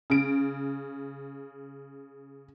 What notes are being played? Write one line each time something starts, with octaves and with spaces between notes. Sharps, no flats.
C#3 D7